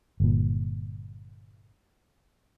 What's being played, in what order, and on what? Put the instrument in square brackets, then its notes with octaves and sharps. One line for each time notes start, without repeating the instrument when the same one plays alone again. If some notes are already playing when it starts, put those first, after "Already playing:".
[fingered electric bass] G1 A#2